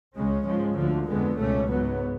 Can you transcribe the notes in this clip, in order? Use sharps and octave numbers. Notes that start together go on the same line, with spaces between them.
C#2 C#3 G#3 C#4
G#2 F3 G#3
D2 D3 F3
F2 D3 G#3 B3
C#2 B2 A3 C#4
G#2 F#3 B3